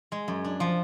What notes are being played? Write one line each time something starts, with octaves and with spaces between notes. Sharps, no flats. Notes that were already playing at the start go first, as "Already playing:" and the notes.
G#3
F#2
D4
F3